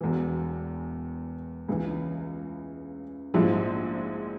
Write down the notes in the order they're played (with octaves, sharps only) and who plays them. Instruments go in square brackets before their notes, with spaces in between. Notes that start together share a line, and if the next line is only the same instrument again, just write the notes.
[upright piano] E1 E2 E3
C#2 C#3 E3
A#1 G#2 F3 G#3 E4